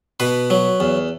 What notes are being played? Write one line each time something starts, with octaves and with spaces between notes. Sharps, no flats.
B2 B4
F#3
E2